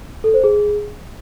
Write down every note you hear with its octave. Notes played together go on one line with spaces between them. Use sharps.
A4
C5
G#4